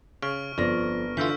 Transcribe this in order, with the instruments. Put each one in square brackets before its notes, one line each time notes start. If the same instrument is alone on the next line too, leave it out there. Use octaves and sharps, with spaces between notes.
[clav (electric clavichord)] C#3 [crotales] C#6 F6 D7
[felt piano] G1 D5 A#6 [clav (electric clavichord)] F2
[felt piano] D3 [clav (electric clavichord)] E3 F4 [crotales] E6 G6 B6